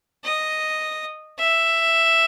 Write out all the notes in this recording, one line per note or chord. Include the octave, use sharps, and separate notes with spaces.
D#5
E5